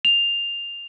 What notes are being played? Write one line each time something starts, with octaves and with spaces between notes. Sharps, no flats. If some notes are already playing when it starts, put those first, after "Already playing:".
F7